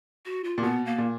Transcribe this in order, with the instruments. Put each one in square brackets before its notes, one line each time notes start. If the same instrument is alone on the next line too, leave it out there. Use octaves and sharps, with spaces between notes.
[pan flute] F#4
F4
[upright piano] A#2
[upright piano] B2 [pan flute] B3
[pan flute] A#3
[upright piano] A#2